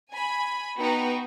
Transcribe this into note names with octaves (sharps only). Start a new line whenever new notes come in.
G#5 B5
B3 D#4 F#4 G5